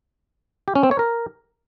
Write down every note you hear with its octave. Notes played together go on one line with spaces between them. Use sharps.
G4
C#4
C4
C#5
A#4